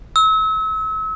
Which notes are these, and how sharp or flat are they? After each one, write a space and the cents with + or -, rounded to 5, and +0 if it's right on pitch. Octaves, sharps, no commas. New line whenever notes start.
E6 -35